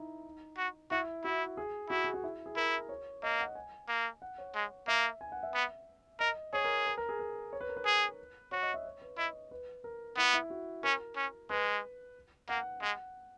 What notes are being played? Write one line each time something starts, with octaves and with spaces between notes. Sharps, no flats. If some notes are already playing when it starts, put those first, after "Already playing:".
Already playing: D#4 E4
F#4
E4 F#4
E4 F#4
G#4
E4 F#4
G#4
F#4
E4
G#4
E4 A#4
C#5
A#3 D#5
F#5
G#5
A#3
F#5
C#5
G#3
A#3 E5
G#5
F#5
E5
B3
A#4 D#5
G#4 C#5
A#4
A#4
A#4
G#4
A#4
C#5
B4
A#4
B4
G#4
F#4 C#5
D#5
E5
C#5
B4
E4 D#5
B4
A#4
B3 E4
E4
F#4
C#4 A#4
C#4
G#3 B4
A#3 F#5
G#3 F#5